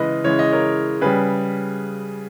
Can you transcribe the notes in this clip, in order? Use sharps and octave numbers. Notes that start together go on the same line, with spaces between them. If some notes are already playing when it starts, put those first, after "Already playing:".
Already playing: C#3 E3 G#3 B4 D#5
C#3 E3 G#3 C#5
D#5
A#4 C#5
C#3 G3 G#4 B4